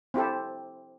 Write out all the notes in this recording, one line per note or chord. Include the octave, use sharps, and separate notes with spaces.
C4 E4 G4 A4